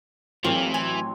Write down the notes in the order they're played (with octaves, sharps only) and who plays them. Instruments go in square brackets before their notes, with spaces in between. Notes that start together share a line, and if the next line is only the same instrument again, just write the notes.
[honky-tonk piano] A1 F#3 [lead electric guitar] E3 [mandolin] A#3 G#4 [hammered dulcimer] C4 C#5
[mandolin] G#5